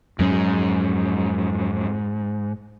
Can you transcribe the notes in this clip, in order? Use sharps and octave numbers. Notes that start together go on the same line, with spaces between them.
F2 G#2 F#3 C#4